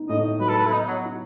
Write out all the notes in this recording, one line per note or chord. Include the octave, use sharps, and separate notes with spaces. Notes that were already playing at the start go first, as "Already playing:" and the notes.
Already playing: B3 D#4
A2 D#5
F#3 B4
A4
B4
E4
B3 D#4
F#3
E4